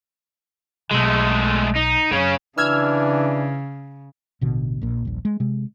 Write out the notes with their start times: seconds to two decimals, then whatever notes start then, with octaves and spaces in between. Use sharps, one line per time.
0.91 B1 G#3 A3
1.75 D#4
2.11 F#2 C#3 C#4
2.58 C#3 E3 D4 E6 F6 G#6
4.41 A1 B2 D3
4.82 A#1 A#2
5.05 D#1 A#1
5.25 G#3
5.40 C3 G#3